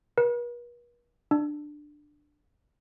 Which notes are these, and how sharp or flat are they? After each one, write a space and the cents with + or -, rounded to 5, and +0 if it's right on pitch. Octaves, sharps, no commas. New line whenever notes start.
B4 -45
D4 +15